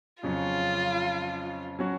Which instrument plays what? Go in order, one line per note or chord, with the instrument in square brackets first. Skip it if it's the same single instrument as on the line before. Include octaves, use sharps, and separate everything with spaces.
[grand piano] F2 C#3 F#3 C#4 [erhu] F4
[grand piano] F#3 C#4 F#4